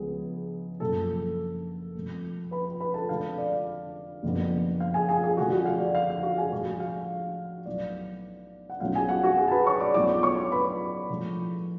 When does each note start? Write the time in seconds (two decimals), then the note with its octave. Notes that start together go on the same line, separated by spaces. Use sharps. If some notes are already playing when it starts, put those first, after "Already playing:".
Already playing: C#2 C#3 F3 B3 G#4
0.80 F#1 F#2 F3 A4 A5
1.94 F1 F2 F3
2.51 B4 B5
2.81 B4 B5
2.94 A4 A5
3.09 F1 F2 D3 G#3 D4 F5
3.38 D5
4.23 F#1 F2 F3 B3 D4
4.80 F5
4.94 G#4 G#5
5.09 G#4 G#5
5.23 G#4 G#5
5.37 F1 F2 D3 F3 F#4 F#5
5.52 F#4 F#5
5.66 F5
5.80 D5
5.95 F5
6.10 F5
6.23 F#4 F#5
6.38 G#4 G#5
6.52 A1 A2 F3 G#3 F#4 F#5
6.80 F5
7.66 B1 A2 F#3 B3 D5
8.70 F#5
8.80 B1 A2 F#3 C#4 F4 F5
8.95 G#4 G#5
9.09 F#4 F#5
9.23 F#4 F#5
9.38 G#4 G#5
9.48 A5
9.51 B4 B5
9.66 C#5 C#6
9.80 D5 D6
9.94 B1 A2 F#3 B3 F4 D5 D6
10.23 C#5 C#6
10.52 B4 B5
11.10 A2 F3 G#3